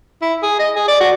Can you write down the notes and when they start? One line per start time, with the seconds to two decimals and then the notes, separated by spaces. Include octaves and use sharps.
0.21 E4
0.43 G#4
0.59 D#5
0.76 G#4
0.88 D5
1.00 F#4